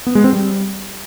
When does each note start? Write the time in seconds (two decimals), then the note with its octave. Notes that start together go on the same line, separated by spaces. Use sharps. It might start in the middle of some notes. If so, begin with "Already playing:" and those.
0.07 B3
0.15 G#3
0.24 C4
0.33 G3